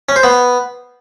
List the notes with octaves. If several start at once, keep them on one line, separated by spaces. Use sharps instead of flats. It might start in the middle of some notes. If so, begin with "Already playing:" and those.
C#4
C5
B3